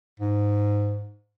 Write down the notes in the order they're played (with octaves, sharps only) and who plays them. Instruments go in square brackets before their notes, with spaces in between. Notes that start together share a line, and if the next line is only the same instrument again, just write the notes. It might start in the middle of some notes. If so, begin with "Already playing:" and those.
[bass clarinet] G#2